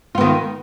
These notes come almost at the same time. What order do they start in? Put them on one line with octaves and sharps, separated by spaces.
F4 B3 D#3